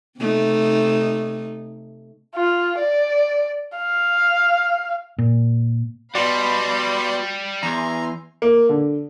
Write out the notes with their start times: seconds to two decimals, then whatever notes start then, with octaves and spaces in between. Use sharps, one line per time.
0.19 C3 A3 D#4
2.36 F4
2.80 D5
3.78 F5
5.18 A#2
6.15 G3 F#4 B4 D5 F5 B5 C6 G6
7.63 E2 G#5 A#5 C6
8.42 A#3
8.69 D3